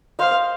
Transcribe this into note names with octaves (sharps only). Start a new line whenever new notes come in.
C5 D#5 F5